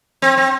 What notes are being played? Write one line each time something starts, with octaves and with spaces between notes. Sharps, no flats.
C4
C4